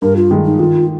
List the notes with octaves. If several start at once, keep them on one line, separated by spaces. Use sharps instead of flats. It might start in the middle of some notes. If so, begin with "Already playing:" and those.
G2 A#4
F4
D#3 G#3
D#4
D#3 F4